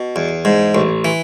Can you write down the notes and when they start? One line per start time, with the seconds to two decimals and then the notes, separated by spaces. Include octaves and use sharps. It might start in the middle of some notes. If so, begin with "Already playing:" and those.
Already playing: B2
0.16 E2
0.45 G#2
0.75 A1
1.05 E3